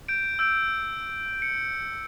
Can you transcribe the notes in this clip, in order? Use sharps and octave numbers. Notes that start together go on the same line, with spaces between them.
G6 D7
E6 G6 D7
C#7